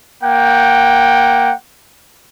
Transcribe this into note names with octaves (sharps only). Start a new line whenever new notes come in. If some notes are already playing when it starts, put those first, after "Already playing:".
A#3 F#5 G5